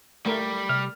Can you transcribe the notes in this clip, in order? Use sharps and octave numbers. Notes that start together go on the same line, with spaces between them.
G3 A3 A#4
C3 F6